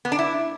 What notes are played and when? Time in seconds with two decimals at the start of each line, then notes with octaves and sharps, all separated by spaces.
0.05 B3
0.12 D4
0.19 E4